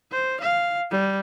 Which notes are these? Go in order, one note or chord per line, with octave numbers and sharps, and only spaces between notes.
C5
F5
G3